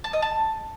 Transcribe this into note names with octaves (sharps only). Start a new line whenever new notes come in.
A5
D#5
A5